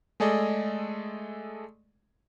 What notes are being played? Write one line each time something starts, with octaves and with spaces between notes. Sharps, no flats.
G#3 A3 G#4 A4 D5 D#5